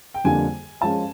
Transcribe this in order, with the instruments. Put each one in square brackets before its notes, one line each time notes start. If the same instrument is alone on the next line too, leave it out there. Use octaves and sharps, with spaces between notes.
[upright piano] G5
[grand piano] F2 D3 G3 A#3 D4 [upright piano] G#5
[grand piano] F3 G#3 C#4 F4 [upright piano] A5